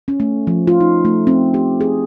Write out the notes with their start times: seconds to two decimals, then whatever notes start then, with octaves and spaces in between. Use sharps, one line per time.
0.08 C#4
0.20 A3
0.47 F3
0.67 F4
0.80 D#4
1.05 A3
1.27 C4
1.54 G4
1.81 G#4